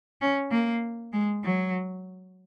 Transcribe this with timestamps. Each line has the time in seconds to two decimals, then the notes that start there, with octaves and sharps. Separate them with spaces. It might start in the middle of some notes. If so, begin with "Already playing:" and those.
0.21 C#4
0.52 A#3
1.13 G#3
1.44 F#3